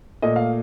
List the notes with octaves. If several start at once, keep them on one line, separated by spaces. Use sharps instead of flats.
A#2 A3 D#5
F5